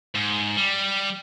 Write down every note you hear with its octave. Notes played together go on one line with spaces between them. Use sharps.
G#2
G3